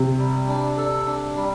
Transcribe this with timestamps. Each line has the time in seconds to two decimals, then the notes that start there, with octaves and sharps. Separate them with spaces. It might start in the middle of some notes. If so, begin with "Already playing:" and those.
Already playing: C3
0.18 G3
0.48 D4
0.77 A4
1.07 D4
1.36 G3